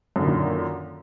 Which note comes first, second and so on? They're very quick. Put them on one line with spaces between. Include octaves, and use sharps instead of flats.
F#2 D3 D#3 A#2